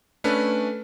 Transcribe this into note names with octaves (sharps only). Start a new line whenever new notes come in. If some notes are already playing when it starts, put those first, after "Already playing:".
A3 C#4 D4 B4